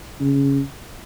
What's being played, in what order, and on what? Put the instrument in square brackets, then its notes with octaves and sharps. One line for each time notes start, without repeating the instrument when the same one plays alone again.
[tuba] C#3